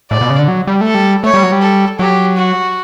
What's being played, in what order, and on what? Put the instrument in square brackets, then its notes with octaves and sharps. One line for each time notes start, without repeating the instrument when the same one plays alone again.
[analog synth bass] A2 [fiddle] D5
[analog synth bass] B2
C#3
D3
F#3
G3
A3
[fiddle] A4
[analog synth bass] G3
[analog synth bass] A3 [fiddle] C#5
[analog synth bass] G3
F#3
G3
[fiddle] A4
[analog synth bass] F#3 [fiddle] G4
[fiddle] F#4